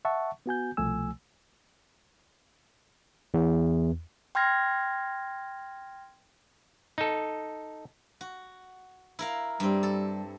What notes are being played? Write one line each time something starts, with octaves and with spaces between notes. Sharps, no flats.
E5 F#5 A5 C#6
B3 F#4 G#5 G6
C2 B2 F3 A3 G#5 E6
E2
G5 C6 F6 G#6 A#6
D#4 A4
F#4
E4 A#4 F5
G2 G3 C4
A4